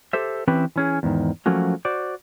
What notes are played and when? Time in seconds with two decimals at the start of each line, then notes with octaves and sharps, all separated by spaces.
0.13 G4 A4 C5 E5
0.48 E3 C4 C#4 E4 G4 B4
0.76 E3 C#4 G#4
1.03 E2 G#2 D#3
1.46 F3 F#3 A3 A#3 C#4 F#4
1.85 F#4 C5 D5